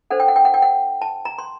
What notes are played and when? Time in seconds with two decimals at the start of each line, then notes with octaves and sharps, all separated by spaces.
0.10 D4 A4 C5 F#5
0.20 G5
0.28 F#5
0.36 G5
0.45 F#5
0.54 G5
0.62 F#5
1.02 A5
1.25 A#5
1.38 C6